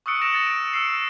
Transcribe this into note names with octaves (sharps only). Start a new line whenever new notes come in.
C#6 D#6 E6 F#6 C#7 D7
A#6 C#7 D7 E7
A6 C#7 E7
D7
E6 C7
C#7